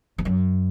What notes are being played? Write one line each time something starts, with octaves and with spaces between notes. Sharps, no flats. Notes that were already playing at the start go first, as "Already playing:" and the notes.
E2
F#2